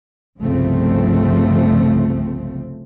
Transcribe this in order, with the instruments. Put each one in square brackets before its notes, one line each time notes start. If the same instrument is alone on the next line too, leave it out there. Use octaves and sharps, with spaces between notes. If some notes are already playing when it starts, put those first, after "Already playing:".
[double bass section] G1 C2 C#3 F3 A3 C4